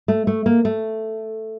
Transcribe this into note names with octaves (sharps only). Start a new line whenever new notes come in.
A3
A3
A#3
A3